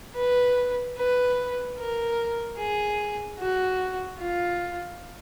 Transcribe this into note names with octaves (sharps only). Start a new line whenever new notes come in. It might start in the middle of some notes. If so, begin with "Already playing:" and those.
B4
B4
A#4
G#4
F#4
F4